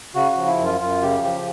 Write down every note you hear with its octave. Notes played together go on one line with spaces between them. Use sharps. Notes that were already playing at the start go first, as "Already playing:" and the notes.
C#3 F#4
F#4
F3
E4
F#2
F4
F#2 F4
C#3 G4
F3 G4